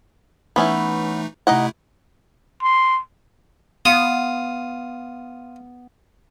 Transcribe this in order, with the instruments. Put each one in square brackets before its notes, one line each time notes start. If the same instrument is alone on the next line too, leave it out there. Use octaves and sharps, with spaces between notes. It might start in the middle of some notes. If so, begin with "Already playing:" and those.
[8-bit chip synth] E3 A3 D#4 [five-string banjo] B3 C#4 E4
[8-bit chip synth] C3 A3 E4 [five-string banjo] D#4 D#5 F#5
[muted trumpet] C6
[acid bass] B3 [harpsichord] F4 D#6